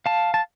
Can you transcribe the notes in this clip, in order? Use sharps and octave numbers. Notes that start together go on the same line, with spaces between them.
F5 A5
A5